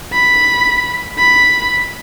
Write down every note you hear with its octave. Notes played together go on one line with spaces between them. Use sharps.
B5
B5